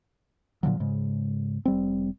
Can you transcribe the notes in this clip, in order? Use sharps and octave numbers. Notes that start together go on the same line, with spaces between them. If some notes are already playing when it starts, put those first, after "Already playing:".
A#2 D3 F3 F#3
G#2 C#3 G#3
F1 G3 C4